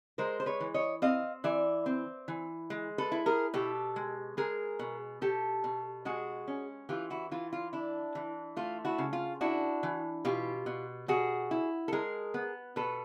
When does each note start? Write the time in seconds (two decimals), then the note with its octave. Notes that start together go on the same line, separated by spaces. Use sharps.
0.18 G#3 A#4 C5
0.40 C5
0.46 B4 C#5
0.60 E3
0.74 C#5 D#5
1.02 C4 D#5 F5
1.44 E3 D5 E5
1.86 C4
2.28 E3
2.70 G#3
2.98 A4 B4
3.12 E4
3.26 G#4 A#4
3.54 B2 G4 A4
3.96 G#3
4.37 G#3 G#4 A#4
4.79 B2
5.21 B2 G4 A4
5.64 B2
6.05 G#3 F#4 G#4
6.48 C#4
6.89 E3 F4 G4
7.10 E4 F#4
7.31 E3 F4
7.53 F4
7.73 D4 E4
8.15 E3
8.56 A3 F4
8.85 E4 F#4
8.98 C#3
9.13 F4
9.41 D4 E4 F#4
9.83 E3
10.25 B2 F4 G4
10.66 B2
11.08 B2 F#4 G#4
11.51 E4
11.88 A4
11.93 G#3 G#4 A#4
12.34 B3
12.76 B2 A4 B4